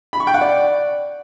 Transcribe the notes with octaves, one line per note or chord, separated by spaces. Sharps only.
B5
C#6
G5
F#5
D5